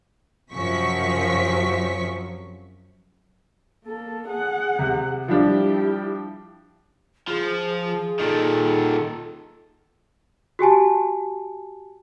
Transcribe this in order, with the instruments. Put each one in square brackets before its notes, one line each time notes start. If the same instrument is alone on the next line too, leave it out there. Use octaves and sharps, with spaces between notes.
[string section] F#2 C3 F3 F#3 C#6 B6
[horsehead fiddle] A#3 A4
G#4 F#5
[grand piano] C3
[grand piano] F3 G3 D4 [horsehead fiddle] E4 G4
[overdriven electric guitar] F3 [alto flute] G#4
[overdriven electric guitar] A#2 D#3 [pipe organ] A4
[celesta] F#4 G4 G#5 A5